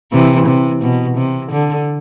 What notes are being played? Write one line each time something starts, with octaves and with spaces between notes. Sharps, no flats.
C3 E3
C3
B2
C3
D3